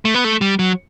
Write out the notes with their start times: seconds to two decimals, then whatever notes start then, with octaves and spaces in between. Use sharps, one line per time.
0.05 A3
0.15 B3
0.24 A3
0.41 G3
0.59 F#3